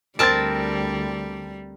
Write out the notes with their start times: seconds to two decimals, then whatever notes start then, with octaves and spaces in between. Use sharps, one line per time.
0.19 D2 G3 C4 A#4 A5 A6 D7